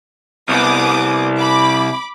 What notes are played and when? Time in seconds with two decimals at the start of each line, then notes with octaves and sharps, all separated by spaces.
0.49 C2 B3 D6 D#6
1.38 B5 D6